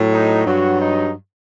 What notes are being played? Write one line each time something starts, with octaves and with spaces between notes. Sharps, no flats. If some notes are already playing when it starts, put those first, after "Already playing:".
Already playing: A2 F#3
D#4
G2 F#3 F#4
D#4